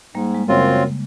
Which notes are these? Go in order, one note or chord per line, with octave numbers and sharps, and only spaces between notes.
G#2 G3 A#3
G#3
F#2 C#3 C4 F4